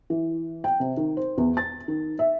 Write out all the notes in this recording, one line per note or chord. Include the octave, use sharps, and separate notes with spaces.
E3
G5
C3
D#3
C5
E2
A6
D#3
E5